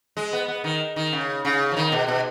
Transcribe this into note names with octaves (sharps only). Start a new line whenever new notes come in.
G#3
B3
B3
D#3
D#3
C#3
C#3
F3
D#3
B2
B2